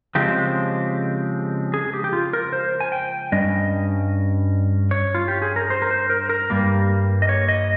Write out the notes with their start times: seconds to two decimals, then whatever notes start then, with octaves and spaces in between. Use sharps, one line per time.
0.15 C#3 F3 G#3 C4 G4
1.74 G#4
1.94 G4
2.04 G4
2.13 F4
2.33 A#4
2.53 C5
2.80 G#5
2.92 G5
3.32 G2 G3 C#4 D#5
4.91 C#5
5.15 F4
5.28 G4
5.42 G#4
5.56 A#4
5.70 C5
5.82 A#4
5.91 C5
6.10 A#4
6.29 A#4
6.50 G2 G3 A#3
7.22 D#5
7.29 C#5
7.48 D#5